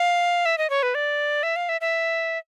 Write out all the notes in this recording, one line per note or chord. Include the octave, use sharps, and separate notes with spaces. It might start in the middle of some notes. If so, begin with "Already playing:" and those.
Already playing: F5
E5
D#5
C#5
B4
D5
E5
F5
E5
E5